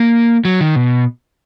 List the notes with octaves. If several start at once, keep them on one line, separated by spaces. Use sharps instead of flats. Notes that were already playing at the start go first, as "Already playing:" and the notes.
Already playing: A#3
F#3
D#3
B2